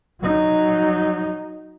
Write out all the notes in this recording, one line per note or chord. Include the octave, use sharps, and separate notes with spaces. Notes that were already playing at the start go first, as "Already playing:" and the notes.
F#3 D#4